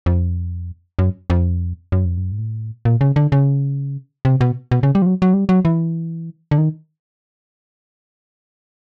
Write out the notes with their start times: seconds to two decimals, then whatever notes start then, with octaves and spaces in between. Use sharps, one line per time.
0.06 F2
0.99 F#2
1.30 F2
1.92 F#2
2.05 F2
2.18 F#2
2.32 G#2
2.39 A2
2.85 A#2
3.01 C#3
3.16 D3
3.32 C#3
4.25 C3
4.41 B2
4.71 B2
4.83 C#3
4.95 G3
5.02 F3
5.06 F#3
5.22 F#3
5.34 G3
5.49 F#3
5.65 E3
6.51 D3
6.58 D#3